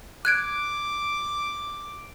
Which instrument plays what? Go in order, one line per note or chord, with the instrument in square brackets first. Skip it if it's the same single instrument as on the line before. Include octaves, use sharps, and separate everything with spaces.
[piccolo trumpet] D6 [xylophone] F#6 G#6 D7